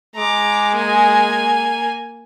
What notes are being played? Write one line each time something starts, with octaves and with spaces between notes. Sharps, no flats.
G#3 A#5 D6
A#3 G#5